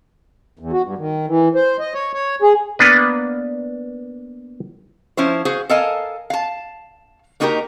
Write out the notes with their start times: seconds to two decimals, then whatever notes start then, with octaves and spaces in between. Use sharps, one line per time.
0.59 E2
0.73 F#4
0.84 G2
0.98 D#3
1.27 E3
1.55 C5
1.80 D#5
1.94 C#5
2.13 C#5
2.42 G#4
2.79 A#3 B3 D4 B4
5.17 F3 C#4 E4 C5
5.45 F#4 G#4 C5 F5
5.69 A4 A#4 D#5 F5 G#5 A5
6.30 F5 A5
7.40 A#3 D#4 F#4 G4 A4 A#4